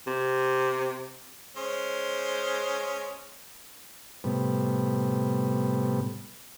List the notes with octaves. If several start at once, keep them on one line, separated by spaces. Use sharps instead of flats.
C3
G#3 C#4 C5
A2 C3 G3 B3